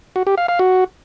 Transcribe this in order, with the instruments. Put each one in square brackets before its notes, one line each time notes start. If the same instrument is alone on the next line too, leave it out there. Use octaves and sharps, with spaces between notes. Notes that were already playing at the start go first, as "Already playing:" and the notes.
[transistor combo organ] F#4
G4
F5
F5
F#4